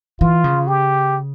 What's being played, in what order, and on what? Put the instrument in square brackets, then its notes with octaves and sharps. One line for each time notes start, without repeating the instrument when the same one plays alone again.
[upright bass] E3 [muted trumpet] F4
[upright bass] C#3
[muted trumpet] G4